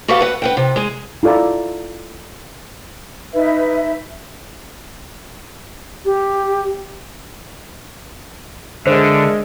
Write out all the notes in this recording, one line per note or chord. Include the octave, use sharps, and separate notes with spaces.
F#4 G4 A4 B4 F5 F#5
B4 F#5
B4 F#5 G5
C3
G#3 G#4
E4 F4 A4 D5 A#5
D#4 B4 E5
G4
D3 G#3 D4 A#4 C5 E5